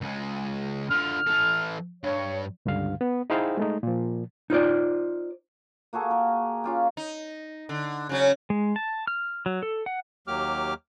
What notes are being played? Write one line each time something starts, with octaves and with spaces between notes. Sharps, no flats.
C#2 G#3
D3 F4 F6
E3 A4
G2 C#5
C#2 G2 D3 F5
B3
D#4 E4 G#4 C5 F5 G5
G#3 A3 D#4
A#2 F3
D#4 F4 C5 D5
A#3 F#4 G#4 A4
A#4
C#4 F4 G4
D#4
D3
C#3 F#3 C#4
G#3
A5
F6
F#3
A4
F#5
D#2 F#3 A#3 G4 D6 F6